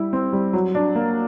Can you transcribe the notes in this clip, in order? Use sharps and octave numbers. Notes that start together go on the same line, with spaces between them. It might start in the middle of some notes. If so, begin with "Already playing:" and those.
Already playing: G3 E4
C4
G3
F#3
D4
A#3